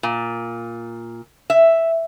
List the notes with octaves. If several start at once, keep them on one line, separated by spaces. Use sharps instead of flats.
A#2
E5